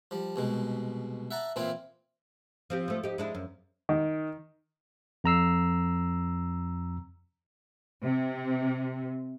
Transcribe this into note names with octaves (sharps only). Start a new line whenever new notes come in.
F3 G3
C2 B2 G#3
E5 F#5 A5 A#5
A#2 E3 C4 E4 F4
F3 C4 G4
F3 A3
D#4 G4
G#3 D4 E4
F#2
D#3
F2 A#5 E6 C7
C3